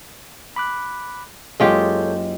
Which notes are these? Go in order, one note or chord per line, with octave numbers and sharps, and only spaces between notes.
B5 D6 F#6
F#1 G#3 F4 G4 A4 C#5 D#5 G6